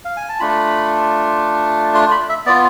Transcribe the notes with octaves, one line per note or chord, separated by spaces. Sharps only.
F5
G#5
A5
A3 D4 F4 B5
C6
B5
E5
B3 F4 D5